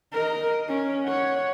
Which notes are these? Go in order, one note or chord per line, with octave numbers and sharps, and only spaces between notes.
A#4 D#5
C#4
C#5 F#5